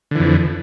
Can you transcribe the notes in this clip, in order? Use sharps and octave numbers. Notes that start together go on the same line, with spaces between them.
F2 D3 E3